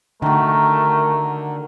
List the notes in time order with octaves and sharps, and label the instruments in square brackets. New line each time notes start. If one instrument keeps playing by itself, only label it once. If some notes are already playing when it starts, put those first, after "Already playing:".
[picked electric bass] D3 [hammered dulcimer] D#3 F#4 [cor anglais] A3 [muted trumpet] A#4